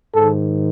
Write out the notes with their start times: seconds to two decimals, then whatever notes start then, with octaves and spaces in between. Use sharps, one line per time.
0.15 G#2 A4
0.21 D#3